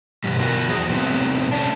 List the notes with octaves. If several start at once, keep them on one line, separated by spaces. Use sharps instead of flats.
G2 B2 E3 G3
B3 F#4 A#4
E2 F3 G#4
C3 G3 A3 B3 C4
A3 C#4 D4